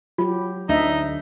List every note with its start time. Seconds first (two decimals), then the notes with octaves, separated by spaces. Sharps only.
0.18 F#3 F4 G4
0.69 D2 D4 D#4 D#5 E5